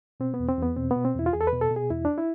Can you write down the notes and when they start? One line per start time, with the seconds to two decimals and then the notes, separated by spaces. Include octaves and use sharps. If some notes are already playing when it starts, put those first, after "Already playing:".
0.20 B2 C4
0.34 B3
0.40 E2
0.48 C4
0.58 E2 B3
0.76 B2 C4
0.91 B3
0.96 B2
1.05 C4
1.15 E2 E4
1.26 F4
1.33 E2 G#4
1.41 A4
1.47 B4
1.53 B2
1.61 A4
1.71 B2
1.76 G#4
1.90 E2 E4
2.05 D4
2.18 E4